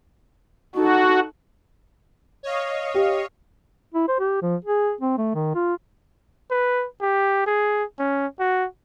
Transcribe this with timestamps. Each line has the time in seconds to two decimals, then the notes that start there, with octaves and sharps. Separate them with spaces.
0.75 D#4 F#4 A4
2.43 C#5 D#5 F5
2.94 G4
3.94 E4
4.08 C5
4.19 G4
4.42 F3
4.65 G#4
5.01 C4
5.17 A3
5.35 D#3
5.55 F4
6.51 B4
7.01 G4
7.47 G#4
7.99 C#4
8.39 F#4